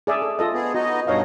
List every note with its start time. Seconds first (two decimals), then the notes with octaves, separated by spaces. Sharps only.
0.07 G#4 D5 E5
0.22 A4
0.39 F4 A4 D#5
0.54 B3 G#4
0.75 B3 D#4 F#4 D#5
1.07 G2 B2 D#4 C#5 D#5 F5